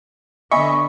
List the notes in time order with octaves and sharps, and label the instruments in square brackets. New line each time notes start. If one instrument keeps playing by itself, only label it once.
[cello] D3 B3 [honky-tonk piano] D#5 E5 G#5 [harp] B5 [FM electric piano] C#6